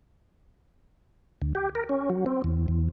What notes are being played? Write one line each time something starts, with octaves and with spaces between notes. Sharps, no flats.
D2
G4
A#4
C#4
F#3
C4
E2
E2